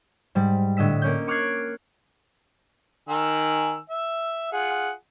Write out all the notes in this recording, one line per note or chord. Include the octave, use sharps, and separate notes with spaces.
G#2 G3
A2 D3 D#5 E6 B6
A#3 C#4 G6
C#6 D6 F6 F#6 G#6 C7
D#3 G#5 E6
E5
F4 G#4 F#5